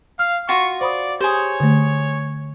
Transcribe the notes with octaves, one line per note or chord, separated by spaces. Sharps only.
F5 F6
F4 F#4 C#6
C5 D5 B5 D#6
G4 G#4 C5 C#5
D3 A3